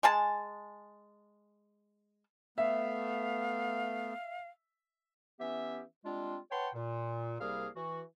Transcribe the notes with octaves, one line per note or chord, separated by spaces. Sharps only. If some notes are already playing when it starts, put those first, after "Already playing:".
G#3 G#4 A5
A3 B3 E5 F5
E3 B3 C#4 G4 E5
G3 G#3 C4 D4 F4
B4 C#5 F#5 G5 A5 C6
A#2
C2 G3 A#3 G#4 A#4 F5
E3 F#4